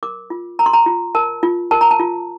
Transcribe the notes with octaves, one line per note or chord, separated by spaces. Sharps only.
A#4 D6
F4
A#4 A#5
C6
A#5
F4
A#4 A5
F4
A#4 A5
A#5
A5
F4